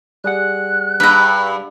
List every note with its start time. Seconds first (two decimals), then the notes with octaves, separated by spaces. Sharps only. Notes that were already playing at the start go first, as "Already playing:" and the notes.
0.24 G3 G#4 F#5 F#6
1.00 G2 B4 A#5